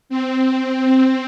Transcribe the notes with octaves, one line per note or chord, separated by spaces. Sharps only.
C4